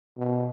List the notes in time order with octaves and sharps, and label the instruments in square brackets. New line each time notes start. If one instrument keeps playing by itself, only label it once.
[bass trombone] B2